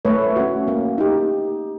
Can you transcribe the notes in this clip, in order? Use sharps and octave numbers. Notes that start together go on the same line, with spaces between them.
A3 B4 C#5
C#4 F#4
A#3
D#4 G4